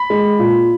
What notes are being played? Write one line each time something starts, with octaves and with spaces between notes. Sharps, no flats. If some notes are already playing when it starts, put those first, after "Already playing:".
Already playing: B5
G#3
A#2